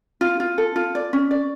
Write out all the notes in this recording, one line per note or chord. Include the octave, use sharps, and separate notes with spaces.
F4
F4
A4
F4
D5
C#4
D5